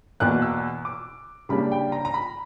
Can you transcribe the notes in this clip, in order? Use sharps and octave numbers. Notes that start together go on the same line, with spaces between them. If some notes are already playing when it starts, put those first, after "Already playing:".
E2 B2 A#3 F#6
E6
D6
C#3 G3 A#3 D4 B5
G5
A#5
A#5
B5